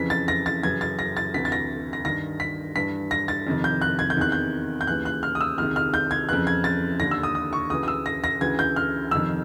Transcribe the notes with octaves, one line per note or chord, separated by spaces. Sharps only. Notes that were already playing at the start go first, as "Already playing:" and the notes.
Already playing: F2 C#3 E3 B6
A6
A#6
A6
F#2 C#3 E3 G#6
A6
A#6
A6
D2 C3 E3 B6
A6
A#6
A#6
G2 D#3 A#6
B6
G2 E3 B6
A#6
A6
F2 C3 D#3
G6
F#6
G#6
G6
E2 C3 D#3 F#6
G6
G6
D#2 C#3 E3 F#6
F#6
F6
D#6
E6
C#2 C3 D#3 F6
F6
G6
G#6
F2 C#3 E3 F#6
G#6
A6
D#2 D3 A#6
E6
D#6
D#6
C#6
D2 C#3 E3 D#6
D#6
E6
A#6
A#6
D2 C#3 E3 G#6
G6
F6
F2 C3 D#3 E6